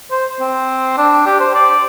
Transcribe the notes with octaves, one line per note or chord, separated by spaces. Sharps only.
C5
C4
D4
G4
C5
D5